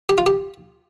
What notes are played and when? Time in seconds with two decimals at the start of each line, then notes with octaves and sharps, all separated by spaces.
0.09 G4
0.18 F4
0.26 G4